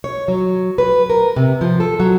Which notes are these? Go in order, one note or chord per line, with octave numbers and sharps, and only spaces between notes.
C#5
F#3
B4
A#4
C3
F3
A4
F#3